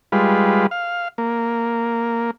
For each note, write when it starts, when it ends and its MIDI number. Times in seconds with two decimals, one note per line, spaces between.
0.12 0.67 55
0.12 0.67 56
0.12 0.67 65
0.12 0.67 71
0.71 1.08 77
1.18 2.31 58